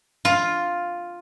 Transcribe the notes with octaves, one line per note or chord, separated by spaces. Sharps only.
F4